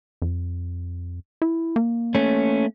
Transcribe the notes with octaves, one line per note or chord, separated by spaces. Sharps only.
F2
E4
A#3
A3 C#4